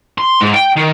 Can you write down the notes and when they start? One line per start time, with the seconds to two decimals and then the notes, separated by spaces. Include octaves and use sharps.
0.18 C6
0.41 G#2
0.54 G5
0.76 D#3